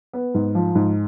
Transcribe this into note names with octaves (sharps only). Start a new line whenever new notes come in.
B3
G#2
F3
G#2